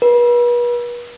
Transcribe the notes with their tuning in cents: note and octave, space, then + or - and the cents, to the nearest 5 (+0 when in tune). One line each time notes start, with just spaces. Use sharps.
B4 -40